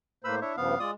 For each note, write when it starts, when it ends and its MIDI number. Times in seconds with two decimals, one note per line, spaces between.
0.24 0.40 45
0.24 0.40 58
0.24 0.35 71
0.24 0.40 72
0.24 0.35 83
0.24 0.35 88
0.41 0.56 62
0.41 0.56 64
0.41 0.53 73
0.41 0.56 76
0.57 0.75 43
0.57 0.75 49
0.57 0.75 53
0.57 0.79 59
0.57 0.79 77
0.79 0.94 56
0.79 0.91 65
0.79 0.91 74
0.79 0.91 87